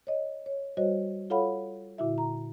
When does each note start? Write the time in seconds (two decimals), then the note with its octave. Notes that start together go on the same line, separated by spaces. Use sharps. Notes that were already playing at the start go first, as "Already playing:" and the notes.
0.07 C#5 D#5
0.46 C#5
0.77 G3 F#4 C5 C#5 D#5
1.30 F4 A4 C#5 F5 F#5 B5
1.98 A#2 D3 E4 F#4 E5
2.18 A#5